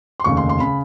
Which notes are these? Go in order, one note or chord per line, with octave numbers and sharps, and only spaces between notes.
C6
F1 D#2 C#3 C#6
C6
C6
C#3 B5